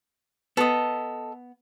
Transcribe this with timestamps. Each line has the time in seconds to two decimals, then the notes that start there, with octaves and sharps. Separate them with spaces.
0.57 B3 A4 D#5